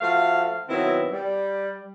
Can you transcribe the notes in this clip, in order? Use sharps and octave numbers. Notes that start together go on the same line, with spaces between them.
F3 A3 F#4 F5
B2 D#3 F#3 C4 E4
G3